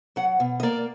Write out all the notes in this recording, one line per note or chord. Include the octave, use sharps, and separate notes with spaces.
F#3 F#5
B2
D#5
A#3 D5